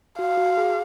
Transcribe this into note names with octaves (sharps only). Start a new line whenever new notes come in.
F#4 F5
F#4
G#4